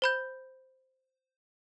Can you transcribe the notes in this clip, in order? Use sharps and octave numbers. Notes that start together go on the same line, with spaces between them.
C5 B5 G6